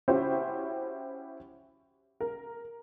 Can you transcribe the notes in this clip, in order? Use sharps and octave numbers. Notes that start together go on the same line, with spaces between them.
C#4 E4 F#4 G4 C5
A#4